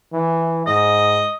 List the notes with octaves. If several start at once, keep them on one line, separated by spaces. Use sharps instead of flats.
E3
G#2 D#5